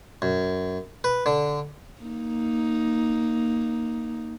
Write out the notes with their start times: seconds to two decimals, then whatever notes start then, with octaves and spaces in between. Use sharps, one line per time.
0.22 F#2
1.04 B4
1.26 D3
2.02 A#3 D#4